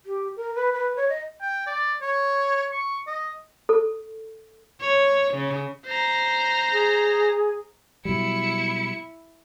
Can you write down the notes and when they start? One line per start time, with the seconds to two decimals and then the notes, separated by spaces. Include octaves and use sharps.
0.06 G4
0.36 A#4
0.55 B4
0.73 B4
0.97 C#5
1.09 D#5
1.41 G5
1.66 D5
2.02 C#5
2.72 C#6
3.07 D#5
3.69 A4
4.81 C#5
5.34 C#3
5.86 C5 A#5
6.73 G#4
8.05 B2 F#3 G3 E4 C#7